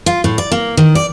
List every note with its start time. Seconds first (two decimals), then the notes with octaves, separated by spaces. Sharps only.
0.06 F4
0.24 A2
0.38 D5
0.52 A#3
0.77 D#3
0.95 D5